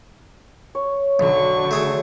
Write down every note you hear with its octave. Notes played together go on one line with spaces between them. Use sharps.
C#5
B1 D3 F#3 C#6
A3 G#4 A4